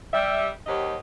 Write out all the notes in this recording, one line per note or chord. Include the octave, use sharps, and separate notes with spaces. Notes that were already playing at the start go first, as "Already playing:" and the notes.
G3 E5
D#2 F#3 G4 C5 D#5